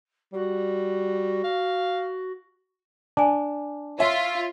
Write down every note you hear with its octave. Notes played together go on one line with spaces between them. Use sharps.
G3 F#4
F5
D4 G#5 A5
F4 C#5 E5